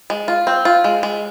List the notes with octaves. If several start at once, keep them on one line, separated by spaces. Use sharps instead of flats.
G#3
F4
C4
F4
G#3
G#3